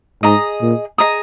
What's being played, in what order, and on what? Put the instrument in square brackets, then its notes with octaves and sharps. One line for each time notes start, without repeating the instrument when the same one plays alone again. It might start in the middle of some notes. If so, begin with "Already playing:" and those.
[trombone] G#2 [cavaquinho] G#4 D#5 A#5 D#6
[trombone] A#2
[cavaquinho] G#4 D#5 A#5 D#6